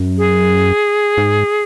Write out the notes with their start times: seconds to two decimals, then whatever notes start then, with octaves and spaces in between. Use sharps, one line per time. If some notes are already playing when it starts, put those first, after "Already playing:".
Already playing: F#2
0.17 G#4
1.17 G#2